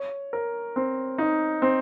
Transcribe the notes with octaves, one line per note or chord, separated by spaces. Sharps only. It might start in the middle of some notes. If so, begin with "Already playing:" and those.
Already playing: C#5
A#4
C4
D#4
C4